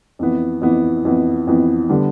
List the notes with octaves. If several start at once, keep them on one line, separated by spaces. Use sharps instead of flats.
F2 E3 B3
F2 E3 B3
F2 E3 B3
F2 E3 B3
D3 G3 B3 D4